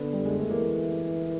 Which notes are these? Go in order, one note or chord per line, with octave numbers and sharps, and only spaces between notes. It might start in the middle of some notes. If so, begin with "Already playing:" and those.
Already playing: D3 B3
G3
G#3
A3
E3 A#3